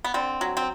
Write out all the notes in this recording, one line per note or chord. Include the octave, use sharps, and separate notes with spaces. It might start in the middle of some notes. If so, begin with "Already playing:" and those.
B3
D3 C4
F#3
C4